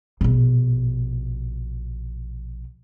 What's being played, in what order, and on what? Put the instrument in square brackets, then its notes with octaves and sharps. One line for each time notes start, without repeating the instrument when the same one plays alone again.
[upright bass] A#1 B2